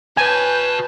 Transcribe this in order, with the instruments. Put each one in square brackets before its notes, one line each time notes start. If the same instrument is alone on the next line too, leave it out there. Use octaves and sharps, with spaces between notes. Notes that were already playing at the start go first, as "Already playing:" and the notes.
[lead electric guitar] F#4 A5 [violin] B4 [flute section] C#5 G6 [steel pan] G#5